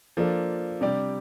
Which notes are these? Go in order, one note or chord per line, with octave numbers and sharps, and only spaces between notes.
F3 A#3 D4 A4
C3 G3 D4 G4 D5